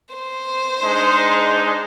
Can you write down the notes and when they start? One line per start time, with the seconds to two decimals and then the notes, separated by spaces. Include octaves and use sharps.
0.14 C5
0.82 G#3 D4 D#4